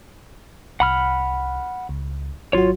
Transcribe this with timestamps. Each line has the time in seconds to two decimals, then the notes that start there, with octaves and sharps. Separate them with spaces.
0.80 C2 F#5 B5 F6
1.89 C#2
2.53 G#1 F#3 F4 F#4 C#5